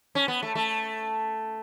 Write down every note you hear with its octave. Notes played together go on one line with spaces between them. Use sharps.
C#4
B3
A3
A3